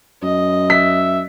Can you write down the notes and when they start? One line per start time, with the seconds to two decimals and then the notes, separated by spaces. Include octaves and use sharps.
0.23 F#2 D#5
0.70 E5 B6